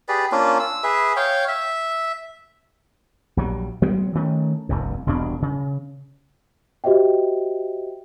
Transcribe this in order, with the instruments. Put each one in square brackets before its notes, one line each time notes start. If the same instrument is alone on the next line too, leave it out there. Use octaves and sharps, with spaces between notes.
[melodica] G4 G#4 B4 D5
A#3 C#4 D4 F4
E6
G#4 B4 E5
C#5 F5 G5
E5
[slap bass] A#1 F#3 G3
F#3 G#3 B3 C4
D#3 A3 C#4
F1 C2 G2
E1 C2 B2 D4
C#3
[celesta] F#4 G4 C5 D#5 E5 G5